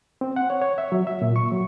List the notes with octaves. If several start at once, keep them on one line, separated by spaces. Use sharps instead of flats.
C4
F#5
C#5
C#5
E5
F#3
E5
A#2
C#6
F#3